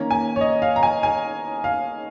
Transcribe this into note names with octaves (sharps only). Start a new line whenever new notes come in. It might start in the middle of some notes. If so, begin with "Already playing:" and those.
Already playing: D#3 A#3 C#4 A#5
G#5
C#5
D#5
F5
A#5
G#5
G#5
F5